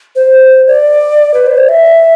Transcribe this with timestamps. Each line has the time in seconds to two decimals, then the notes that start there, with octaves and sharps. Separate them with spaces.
0.16 C5
0.68 D5
1.34 B4
1.46 C5
1.58 D5
1.69 E5